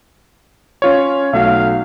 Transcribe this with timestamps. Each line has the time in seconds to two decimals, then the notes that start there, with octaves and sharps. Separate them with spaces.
0.82 C#4 F4 C#5
1.33 B1 A3 F#4 F5